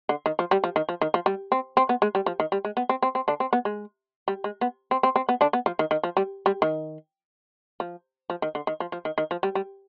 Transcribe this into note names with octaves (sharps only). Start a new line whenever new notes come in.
D3
D#3
F3
G3
F3
D#3
F3
D#3
F3
G3
C4
C4
B3
G#3
G3
F3
D#3
G3
G#3
B3
C4
C4
C4
D3 D4
C4
B3
G#3
G3
G#3
B3
C4
C4
C4
B3
D3 D4
B3
F3
D#3
D#3
F3
G3
G3
D#3
F3
F3
D#3
D3
D#3
F3
F3
D#3
D#3
F3
G3
G3